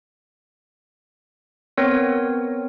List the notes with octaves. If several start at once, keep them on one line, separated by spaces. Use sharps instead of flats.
B3 C4 A#4 C#5